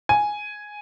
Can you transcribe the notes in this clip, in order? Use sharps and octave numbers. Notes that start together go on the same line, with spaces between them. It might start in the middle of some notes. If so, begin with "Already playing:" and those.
G#5